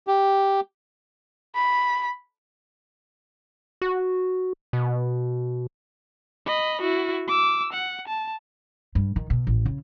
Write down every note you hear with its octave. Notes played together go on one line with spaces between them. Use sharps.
G4
B5
F#4
B2
D#5 B5
E4 F#4
D6 E6
F#5
A5
G2
D#3
B2
A1
C#3